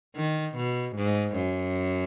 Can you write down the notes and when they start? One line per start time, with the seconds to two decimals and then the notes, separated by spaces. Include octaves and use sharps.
0.16 D#3
0.56 B2
0.96 G#2
1.36 F#2